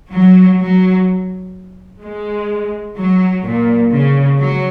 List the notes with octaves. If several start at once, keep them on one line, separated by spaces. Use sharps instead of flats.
F#3
F#3
G#3
F#3
A#2
C#3
F#3